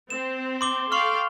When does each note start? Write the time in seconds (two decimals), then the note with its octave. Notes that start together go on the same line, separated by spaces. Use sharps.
0.10 C4 E7
0.61 C6 D6 G7
0.92 A4 F5 G5 C6 C#6 F6